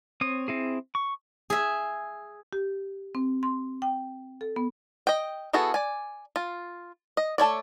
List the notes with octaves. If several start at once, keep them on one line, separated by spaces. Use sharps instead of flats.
C4 C#5 D#6
C4 E4 G#4
C#6
G#4 E5
G4
C4
C6
G5
A4
B3
D#5 G5
B3 E4 F#4 G#4 A4
D5 G#5
F4
D#5
A3 A4 C#5 D5